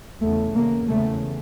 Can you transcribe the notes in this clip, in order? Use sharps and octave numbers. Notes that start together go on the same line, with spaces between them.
E2 C#3 A3
E2 C#3 A#3
E2 C#3 A3